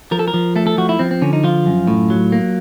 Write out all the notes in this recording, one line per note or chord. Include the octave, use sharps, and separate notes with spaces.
F3 A#4
A4
A#4
F3
A3 A4
A4
F3 F#4
E4
F3 C4
C4
D3 C#4
D#4
F3 F4
F#2
A2
F#3
A#3